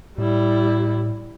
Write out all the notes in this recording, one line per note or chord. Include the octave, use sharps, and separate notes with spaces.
A2 G3 E4